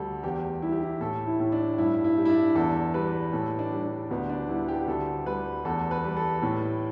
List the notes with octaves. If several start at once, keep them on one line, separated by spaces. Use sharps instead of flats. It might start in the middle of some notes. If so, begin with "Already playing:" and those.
Already playing: D2 G3 A4
E2 G4
G3 E4
G4
E4
A2 A4
E4
A2
D4
G2 E4
E4
G3
E4
D4
E2 A4
G3 B4
A2 A4
D4
G3
D4
D2 B3
D4
G3 E4
G4
D2 A4
G3 B4
E2 A4
B4
G3
A4
A2